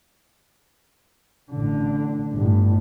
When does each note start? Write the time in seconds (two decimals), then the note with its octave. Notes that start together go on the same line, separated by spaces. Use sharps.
1.52 A1 D3
2.33 G1 A2